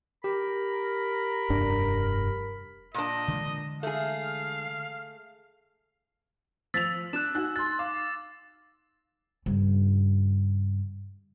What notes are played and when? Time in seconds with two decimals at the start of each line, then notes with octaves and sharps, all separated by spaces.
0.24 G4 A#4 B5
1.50 F1 G2 D4
2.94 A#2 D4 D#5
3.28 D3 E3 G#3
3.83 A3 G#4 F5
6.74 F3 E6 A6 B6 F7
7.13 D4 F#6 E7
7.35 D#4 F#4 F#6
7.56 C6 F#6 A6
7.79 F5 D6
9.46 G2 C#3